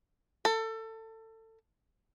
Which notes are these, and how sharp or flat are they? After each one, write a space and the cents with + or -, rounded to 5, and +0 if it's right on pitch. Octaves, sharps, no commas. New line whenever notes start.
A4 +25